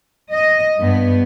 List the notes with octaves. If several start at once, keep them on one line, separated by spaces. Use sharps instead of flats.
D#5
G2 B3